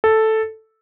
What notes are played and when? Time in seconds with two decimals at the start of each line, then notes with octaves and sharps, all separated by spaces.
0.04 A4